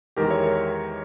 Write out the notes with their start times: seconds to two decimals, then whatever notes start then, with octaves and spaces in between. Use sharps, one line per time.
0.16 E2 D#3 G#3 G4 A#4
0.31 C#5 E5
0.44 A#4 C#5